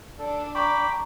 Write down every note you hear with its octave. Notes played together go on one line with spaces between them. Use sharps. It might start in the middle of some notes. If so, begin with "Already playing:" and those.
D4 A4
G5 A#5 B5 C#6 D6